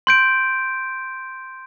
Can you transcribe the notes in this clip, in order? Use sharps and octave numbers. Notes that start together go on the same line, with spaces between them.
C6 G6 D7